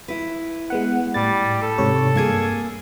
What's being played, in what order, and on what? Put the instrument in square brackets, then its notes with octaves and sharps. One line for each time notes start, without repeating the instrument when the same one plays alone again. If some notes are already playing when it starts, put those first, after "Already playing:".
[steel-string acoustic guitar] E4 B4
[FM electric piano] G#3 B3 F#5
[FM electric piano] A2 A6 [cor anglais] G3
[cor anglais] A4
[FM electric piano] G#2 C3 C#5
[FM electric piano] G2 G#6 [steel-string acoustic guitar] A#3 G#4